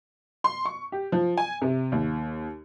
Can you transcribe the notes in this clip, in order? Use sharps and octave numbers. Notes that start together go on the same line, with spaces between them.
C6
C#6
G4
F3
G#5
C3
D#2